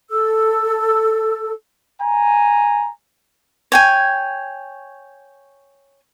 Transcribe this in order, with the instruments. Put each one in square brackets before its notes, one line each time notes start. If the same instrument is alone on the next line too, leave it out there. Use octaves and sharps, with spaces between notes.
[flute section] A4 E6
[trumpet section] G#5 A#5
[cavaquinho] C#5 G5 G#5